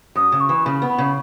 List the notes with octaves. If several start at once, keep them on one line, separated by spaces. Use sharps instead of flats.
F#2 D#6
C#3
C#6
E3
C#3 B5
B3
B5
C#3